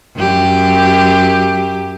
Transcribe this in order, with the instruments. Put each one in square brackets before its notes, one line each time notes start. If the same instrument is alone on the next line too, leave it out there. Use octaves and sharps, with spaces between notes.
[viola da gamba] F#2 G4